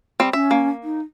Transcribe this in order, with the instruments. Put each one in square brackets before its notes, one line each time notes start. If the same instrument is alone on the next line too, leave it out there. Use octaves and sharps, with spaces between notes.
[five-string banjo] G3 C4
[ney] C#4 [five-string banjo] E5
[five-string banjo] A#3
[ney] D#4